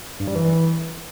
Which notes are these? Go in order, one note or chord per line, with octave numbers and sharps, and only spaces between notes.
G2
G3
E3